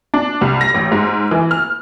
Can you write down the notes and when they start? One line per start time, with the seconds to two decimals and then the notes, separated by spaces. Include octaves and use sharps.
0.14 D4
0.41 C2
0.61 A#6
0.74 A1
0.92 G#2
1.31 E3
1.51 F6